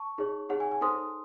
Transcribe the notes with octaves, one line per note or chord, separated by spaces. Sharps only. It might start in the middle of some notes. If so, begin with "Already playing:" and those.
Already playing: A5 C#6
D#4 G#4 C#5
D#4 G#4 C#5 F#5
G#5
G#5
D#4 A4 C5 C6 D#6